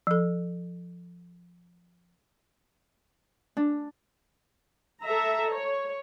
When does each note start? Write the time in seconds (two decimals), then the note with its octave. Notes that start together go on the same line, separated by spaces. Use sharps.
0.07 F3 A4
3.57 D4
5.02 A4 E5 A#5
5.53 C#5